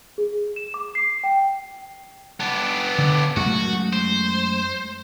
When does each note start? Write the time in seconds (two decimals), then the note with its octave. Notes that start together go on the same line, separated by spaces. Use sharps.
0.18 G#4
0.56 E7
0.74 D6
0.95 C7
1.24 G5
2.40 B3 D4
2.98 D3
3.36 F#2 G#3 A3 F#4
3.93 C5